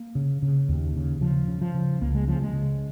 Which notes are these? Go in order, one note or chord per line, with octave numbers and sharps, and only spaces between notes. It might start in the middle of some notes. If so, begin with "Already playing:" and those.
Already playing: A#3
C#3
C#3
D#2
C#3
C#3 F3
C#3
F3
C#3
C#2 A#3
G#3
C#3 F3
G#3
C#3